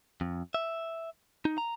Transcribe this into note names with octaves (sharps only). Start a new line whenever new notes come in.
F2
E5
D#4
A#5